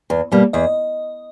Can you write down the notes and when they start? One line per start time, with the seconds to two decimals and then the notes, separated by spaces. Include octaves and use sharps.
0.10 E2
0.32 B2 G3 A#3
0.53 E2 D#5